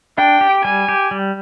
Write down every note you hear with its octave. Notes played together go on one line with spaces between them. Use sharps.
D4 G5
G4
G3 G#5
G4
G3